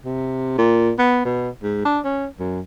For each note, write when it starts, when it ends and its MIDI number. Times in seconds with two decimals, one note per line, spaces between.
0.05 0.57 48
0.58 0.91 46
0.99 1.23 59
1.25 1.50 47
1.63 1.81 44
1.85 1.99 62
2.05 2.27 61
2.40 2.60 42